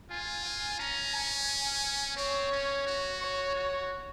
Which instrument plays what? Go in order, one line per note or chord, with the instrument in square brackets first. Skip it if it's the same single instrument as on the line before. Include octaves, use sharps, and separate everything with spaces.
[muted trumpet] F4 [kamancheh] G#5
[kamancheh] G#5
[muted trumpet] C#4 [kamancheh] A#5
[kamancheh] G#5
[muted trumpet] C4 [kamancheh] C#5
[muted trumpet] C#4
F#4
[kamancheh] C#5
[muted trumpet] F#4